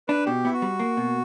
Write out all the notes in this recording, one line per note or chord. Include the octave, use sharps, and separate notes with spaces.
D4 B4
B2 G4
B3 E4
F#4
G3
A#3
B2